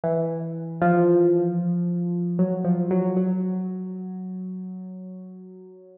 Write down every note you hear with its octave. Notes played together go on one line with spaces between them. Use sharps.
E3
F3
F#3
F3
F#3
F#3